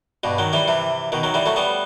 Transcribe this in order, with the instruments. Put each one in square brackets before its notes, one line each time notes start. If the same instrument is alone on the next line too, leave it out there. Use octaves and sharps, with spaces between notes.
[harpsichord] G2 B2
D#3 F#3
E3 G3
C3 E3
B2 D#3
D#3 F#3
E3 G3
F#3 A3
G3 B3